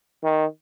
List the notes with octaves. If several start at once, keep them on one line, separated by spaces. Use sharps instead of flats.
D#3